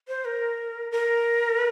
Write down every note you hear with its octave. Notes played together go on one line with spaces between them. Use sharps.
C5
A#4
A#4